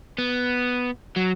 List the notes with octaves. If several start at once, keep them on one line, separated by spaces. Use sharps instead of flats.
B3
F#3